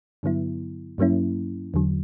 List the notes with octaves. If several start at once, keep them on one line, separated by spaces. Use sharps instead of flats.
G2 D3 F#3 B3 E4
G2 F#3 A#3 C#4 E4
E2 D3 F#3